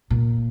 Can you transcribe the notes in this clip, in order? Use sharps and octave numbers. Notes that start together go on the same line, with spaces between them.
A#2